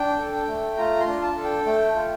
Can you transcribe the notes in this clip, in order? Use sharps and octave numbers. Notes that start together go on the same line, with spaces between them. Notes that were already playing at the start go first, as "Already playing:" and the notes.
Already playing: D4 G5
A4
G5
A3
F4 A#5
C6
D4
A5
A4
G5
A3 G5
F4